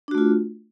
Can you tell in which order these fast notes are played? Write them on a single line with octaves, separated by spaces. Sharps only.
D4 F#4 A3 F4